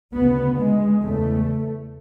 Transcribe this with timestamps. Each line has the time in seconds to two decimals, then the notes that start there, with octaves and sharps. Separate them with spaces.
0.14 D2 C#3 B3
0.58 G#3
1.01 E2 C#3 A3